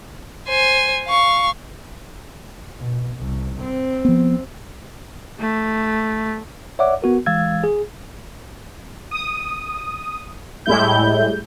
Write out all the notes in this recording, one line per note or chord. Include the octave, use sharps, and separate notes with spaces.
C5 G#5
F5 C#6
B2
C2
C4
F3 B3
A3
C#5 D5 E5 F#5 D6
B3 F#4 A#4
E3 G#3 F5 E6 G#6 A6
G#4
D#6
A2 G3 G#3 E4 G6